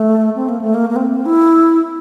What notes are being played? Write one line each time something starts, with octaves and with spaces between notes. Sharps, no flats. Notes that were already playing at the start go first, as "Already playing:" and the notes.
Already playing: A3
C4
A#3
A3
A#3
A#3
C4
E4